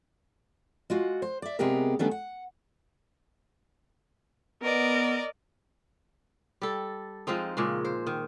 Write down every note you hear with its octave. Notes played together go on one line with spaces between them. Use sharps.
G#3 F4 F#4
C5
D5 E5
C3 G#3 B3 G4 G#4 A#4
D#3 G3 A3 B3 C#4 D4
F#5
B3 A#4 D5 D#5
G3 A4
F3 G#3 C4 D#4
A#2 C#3 G#3
C5
D#3